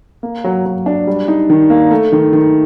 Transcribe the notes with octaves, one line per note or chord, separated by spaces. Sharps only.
A#3
F#3
F#3
D4
G3
D#4
D#3
A#3
A3
D#3
D#3